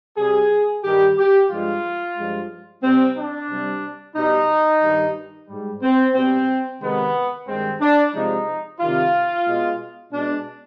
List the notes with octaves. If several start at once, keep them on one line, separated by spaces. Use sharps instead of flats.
C3 G3 G#4
G2 D#3 G3 G4
G4
G2 F3 G#3 F4
G2 F3 G#3
C3 G3 C4
D4
C3 G3
B2 G3 D#4
G2 D#3 G3
G#2 G3
C4
B2 G3 C4
C3 D#3 G#3 B3
G2 D#3 G#3 C4
D4
C3 F3 G#3 D#4
C3 D#3 G3 F4
B2 G#3
B2 G#3 D4